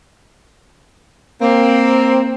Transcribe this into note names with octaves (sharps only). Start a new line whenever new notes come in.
A#3 C4